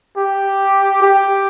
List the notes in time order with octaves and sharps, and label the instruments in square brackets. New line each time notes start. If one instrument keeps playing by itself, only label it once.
[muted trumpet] G4
G4